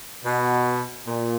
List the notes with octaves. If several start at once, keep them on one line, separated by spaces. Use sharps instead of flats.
B2
A#2